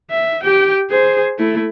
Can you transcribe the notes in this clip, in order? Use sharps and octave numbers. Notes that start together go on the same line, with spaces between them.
E5
G4 G5
G#4 C5
A3 E4